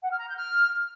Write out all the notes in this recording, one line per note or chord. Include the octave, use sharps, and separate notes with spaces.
F#5
F6
A#5
G6
F6